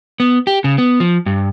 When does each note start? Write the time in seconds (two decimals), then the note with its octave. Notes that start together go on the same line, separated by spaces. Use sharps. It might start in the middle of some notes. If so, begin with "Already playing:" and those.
0.20 B3
0.47 G4
0.64 C#3
0.78 B3
1.00 F3
1.26 G2